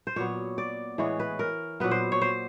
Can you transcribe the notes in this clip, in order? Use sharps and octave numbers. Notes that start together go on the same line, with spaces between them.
C5
A#2 F#3 B3 C#5
D5
A2 E3 G#3 B3 C#5
B4
A#4
A#2 F#3 B3 B4
C5
C#5
C5